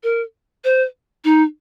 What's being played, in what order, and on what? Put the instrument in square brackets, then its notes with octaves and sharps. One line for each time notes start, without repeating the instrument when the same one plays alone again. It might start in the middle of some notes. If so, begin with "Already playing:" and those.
[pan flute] A#4
C5
D#4